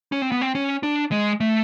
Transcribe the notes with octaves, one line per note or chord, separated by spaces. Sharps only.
C#4
C4
B3
C4
C#4
D4
G#3
A3